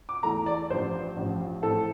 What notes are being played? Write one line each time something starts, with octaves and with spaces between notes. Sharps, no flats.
D6
E2 E3 A3 E4 A#5
D5
A1 G2 F3 C5
A1 G2 F3
A2 E3 A3 C4 A4